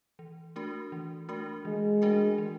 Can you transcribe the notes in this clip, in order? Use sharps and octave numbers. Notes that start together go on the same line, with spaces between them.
E3
A3 D4 F#4 A#4
E3
A3 D4 F#4 A#4
E3 G#3
A3 D4 F#4 A#4
E3